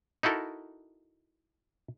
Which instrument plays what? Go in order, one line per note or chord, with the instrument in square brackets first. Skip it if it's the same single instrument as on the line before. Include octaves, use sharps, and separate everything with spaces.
[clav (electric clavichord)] D#4 E4 F#4 A4 A#4